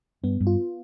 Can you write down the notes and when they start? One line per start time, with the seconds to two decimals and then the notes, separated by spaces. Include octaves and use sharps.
0.24 G2 B3
0.40 G2
0.47 F4